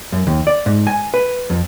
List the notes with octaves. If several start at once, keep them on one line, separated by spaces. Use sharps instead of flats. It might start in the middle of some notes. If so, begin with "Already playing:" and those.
F#2
D#2
D5
G#2
G#5
B4
F2